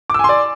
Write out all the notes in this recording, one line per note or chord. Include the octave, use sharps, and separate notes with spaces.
D5 G#5 C6 D6 E6